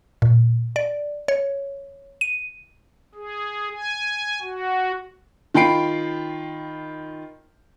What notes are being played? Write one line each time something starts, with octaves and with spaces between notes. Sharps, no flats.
A#2
D5
C#5
D#7
G#4
G#5
F#4
D#3 F4 G5 B5 C7 D7